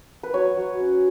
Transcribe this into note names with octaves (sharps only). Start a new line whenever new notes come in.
B4
F#3 C#5
F#3
C#4